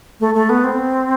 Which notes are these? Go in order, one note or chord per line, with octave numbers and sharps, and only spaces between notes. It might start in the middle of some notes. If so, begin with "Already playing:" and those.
A3
A3
B3
C4